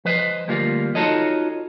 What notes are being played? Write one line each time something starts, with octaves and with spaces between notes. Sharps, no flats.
F3 B4 C5 D#5
D2 F3 G3 A#3 F4
D#4 F4 F#4 A4 C#5 D#5